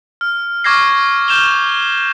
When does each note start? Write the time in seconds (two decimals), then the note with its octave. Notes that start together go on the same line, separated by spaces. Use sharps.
0.21 F6
0.64 C#6 D6 F6 G#6 A#6 C7
1.28 C#6 F6 G6 E7 F7 G7